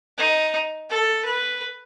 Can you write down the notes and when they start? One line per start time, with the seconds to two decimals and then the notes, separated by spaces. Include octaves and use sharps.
0.18 D#4
0.89 A4
1.25 B4